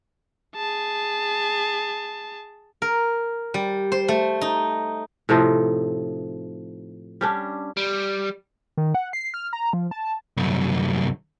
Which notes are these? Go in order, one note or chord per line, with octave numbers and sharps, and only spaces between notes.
G#4 A5
A#4
G3
C5
A3
D#4
A2 C3 F3 D#4
G3 C#4 D4
G3
D#3
F#5
C7
F6
A#5
F3
A5
C2 F#2